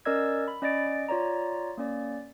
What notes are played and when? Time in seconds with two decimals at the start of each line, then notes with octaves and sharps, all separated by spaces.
0.05 C#4 A#4 D5 D#5 E6 G#6
0.48 B5
0.62 C#4 D5 D#5 A6 D7
1.09 F4 C#5 D5 A#5
1.78 A#3 C#4 D5